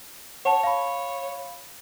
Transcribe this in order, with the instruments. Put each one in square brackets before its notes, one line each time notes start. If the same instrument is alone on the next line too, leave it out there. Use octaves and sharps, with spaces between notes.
[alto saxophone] C#5 [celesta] F#5 A5
[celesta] F5 B5